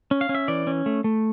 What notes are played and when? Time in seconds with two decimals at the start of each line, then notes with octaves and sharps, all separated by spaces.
0.11 C#4
0.21 F5
0.29 C#4
0.35 E5
0.48 E3 D5
0.67 C#4
0.86 A3
1.04 A3